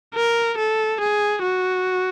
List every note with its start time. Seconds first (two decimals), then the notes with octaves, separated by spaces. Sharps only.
0.15 A#4
0.58 A4
1.00 G#4
1.42 F#4